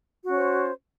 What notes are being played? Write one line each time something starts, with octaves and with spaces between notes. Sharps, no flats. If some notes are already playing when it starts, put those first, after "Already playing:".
C#4 F#4 C5 C#5